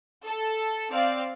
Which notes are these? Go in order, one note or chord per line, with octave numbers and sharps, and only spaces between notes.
A4
C4 D5 F5